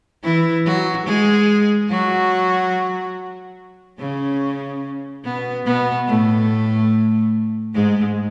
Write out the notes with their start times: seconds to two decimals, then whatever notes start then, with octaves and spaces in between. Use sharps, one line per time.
0.23 E3 E4
0.66 F#3 F#4
1.06 G#3 G#4
1.90 F#3 F#4
3.99 C#3 C#4
5.24 B2 B3
5.66 B2 B3
6.07 A2 A3
7.74 G#2 G#3